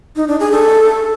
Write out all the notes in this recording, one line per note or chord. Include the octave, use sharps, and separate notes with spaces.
D#4
D4
G#4
A4